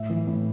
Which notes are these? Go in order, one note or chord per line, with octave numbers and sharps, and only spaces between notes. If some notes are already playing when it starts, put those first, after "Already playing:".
Already playing: A2 E5
E3
A2